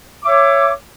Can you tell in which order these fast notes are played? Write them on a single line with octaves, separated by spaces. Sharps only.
D6 E5 C#5